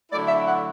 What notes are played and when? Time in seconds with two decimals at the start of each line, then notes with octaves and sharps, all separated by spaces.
0.11 D3 F#3 A3 E4 D5
0.28 E5
0.47 F#5